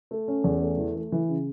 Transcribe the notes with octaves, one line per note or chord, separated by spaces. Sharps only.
A3
C#4
E2
A3
E3
A3
E3
C#3